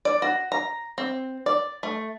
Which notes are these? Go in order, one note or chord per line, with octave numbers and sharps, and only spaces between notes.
D5
F#4
A#5
C4
D5
A3